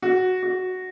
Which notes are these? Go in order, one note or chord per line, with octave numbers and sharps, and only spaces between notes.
F#4
F#4